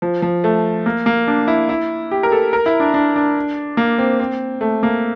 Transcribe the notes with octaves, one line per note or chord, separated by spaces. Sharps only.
F3
F3
A3
A#3
A#3
D4
E4
E4
G4
A#4
A4
A#4
E4
D4
D4
D4
A#3
C4
C4
A3
A#3